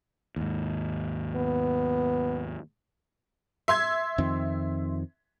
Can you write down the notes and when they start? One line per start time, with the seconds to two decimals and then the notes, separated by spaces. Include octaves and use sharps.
0.36 D#2 G#2
1.36 B3
3.68 E5 C6 G#6
4.18 F2 D#3 C4